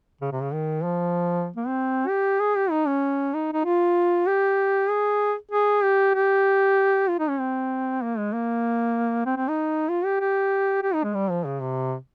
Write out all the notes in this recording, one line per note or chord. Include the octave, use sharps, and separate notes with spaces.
C#3
C3
C#3
D#3
F3
A#3
C4
G4
G#4
G4
D#4
C#4
D#4
D#4
F4
G4
G#4
G#4
G4
G4
F4
D#4
C#4
C4
A#3
G#3
A#3
C4
C4
D#4
F4
G4
G4
G4
D#4
G#3
G3
F3
C#3
C3